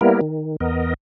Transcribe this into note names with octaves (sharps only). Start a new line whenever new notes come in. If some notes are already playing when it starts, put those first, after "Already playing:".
G3 A#3 B3 E4 A#4
D#3
E2 B3 A#4 D#5